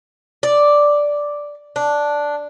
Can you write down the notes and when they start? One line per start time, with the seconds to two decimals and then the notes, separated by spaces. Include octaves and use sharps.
0.43 D5
1.76 D4